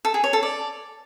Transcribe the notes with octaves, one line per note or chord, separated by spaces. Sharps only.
A4
G#4
C#5
A4
D5